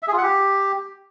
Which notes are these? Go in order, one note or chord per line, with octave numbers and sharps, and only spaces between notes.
E5
G#4
F4
F#5
G4